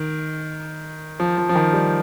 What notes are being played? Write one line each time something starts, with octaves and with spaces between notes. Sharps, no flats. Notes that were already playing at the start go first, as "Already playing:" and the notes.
Already playing: D#3
F3
F3
F3
D#3
G3